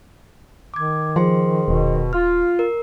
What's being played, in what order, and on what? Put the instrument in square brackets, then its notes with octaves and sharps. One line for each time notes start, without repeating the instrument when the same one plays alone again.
[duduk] D#3 [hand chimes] D6 G#6
[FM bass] F3 [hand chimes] G#4 C5 C6
[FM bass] D#1 [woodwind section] B2
[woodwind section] F4 [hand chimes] F6
[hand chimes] A#4